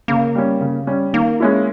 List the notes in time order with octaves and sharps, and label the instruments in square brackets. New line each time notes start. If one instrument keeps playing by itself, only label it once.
[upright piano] C#3 [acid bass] A#3
[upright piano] G3 C#4
C#3
G3 C#4
[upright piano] D#3 [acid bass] A#3
[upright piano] G#3 C#4 E4